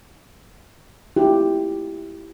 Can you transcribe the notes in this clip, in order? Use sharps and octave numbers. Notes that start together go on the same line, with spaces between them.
E4 F4 G4